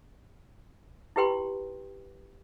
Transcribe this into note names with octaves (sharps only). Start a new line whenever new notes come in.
E4 F4 G4 B4 G5 C6